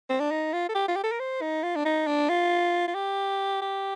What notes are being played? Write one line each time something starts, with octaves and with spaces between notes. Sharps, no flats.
C4
D4
D#4
F4
A4
G4
F4
G4
A4
A#4
C5
D#4
F4
D4
D#4
D4
F4
F4
G4
G4